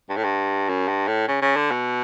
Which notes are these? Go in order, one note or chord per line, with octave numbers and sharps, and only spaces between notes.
G2
A2
G2
F#2
G2
A2
C#3
C#3
D3
B2